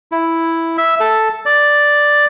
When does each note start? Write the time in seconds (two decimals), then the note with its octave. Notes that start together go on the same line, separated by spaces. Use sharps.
0.12 E4
0.77 E5
1.00 A4
1.46 D5